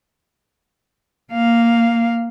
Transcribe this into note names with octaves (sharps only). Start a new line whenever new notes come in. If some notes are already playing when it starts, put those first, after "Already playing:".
A#3 F5